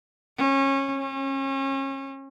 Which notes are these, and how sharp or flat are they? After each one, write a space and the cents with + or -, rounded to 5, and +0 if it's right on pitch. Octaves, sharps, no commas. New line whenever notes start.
C#4 -25
C#4 -35